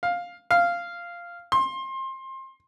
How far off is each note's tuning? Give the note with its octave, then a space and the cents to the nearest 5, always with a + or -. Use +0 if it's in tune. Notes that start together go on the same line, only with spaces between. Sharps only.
F5 +10
F5 -10
C6 +25